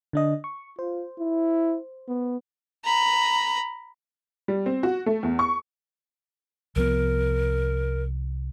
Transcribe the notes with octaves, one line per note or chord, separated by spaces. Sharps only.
D3 D4 D#5
C#6
F4 C5
E4
B3
A#5 B5
G3
C4
F#4
A3
E2
C#6
C2 F3 B3 A#4